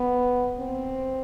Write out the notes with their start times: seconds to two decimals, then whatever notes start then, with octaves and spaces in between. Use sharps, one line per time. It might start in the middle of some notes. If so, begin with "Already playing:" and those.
Already playing: B3
0.59 C4